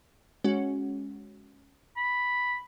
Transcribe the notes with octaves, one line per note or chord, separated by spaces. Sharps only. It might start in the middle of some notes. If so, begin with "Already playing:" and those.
G#3 C#4 F#4
B5